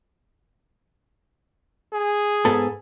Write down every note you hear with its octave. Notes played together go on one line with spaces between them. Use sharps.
G#4
G#2 B3 A4